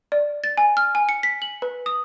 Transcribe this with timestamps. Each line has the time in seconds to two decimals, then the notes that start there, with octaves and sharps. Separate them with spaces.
0.12 D5
0.44 A6
0.57 G#5
0.77 F6
0.95 G#5
1.09 C#7
1.23 B6
1.42 F#7
1.62 B4
1.86 D#6